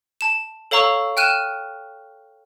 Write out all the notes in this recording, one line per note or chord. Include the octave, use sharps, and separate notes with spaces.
A5 E7
A4 C#5 F5 A#5 C#6 E6
G5 F6 F#6 D#7 E7